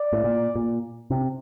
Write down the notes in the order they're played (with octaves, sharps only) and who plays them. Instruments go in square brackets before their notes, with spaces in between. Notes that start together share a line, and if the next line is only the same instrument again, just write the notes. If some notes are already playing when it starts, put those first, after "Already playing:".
Already playing: [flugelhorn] D5
[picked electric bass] A2
A#2
A#2
C3